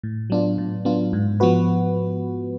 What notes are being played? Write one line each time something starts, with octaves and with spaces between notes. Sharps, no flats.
A2
F#3 B3 D4 F4
A2
F#3 B3 D4 F4
G#2
F3 B3 F#4 B4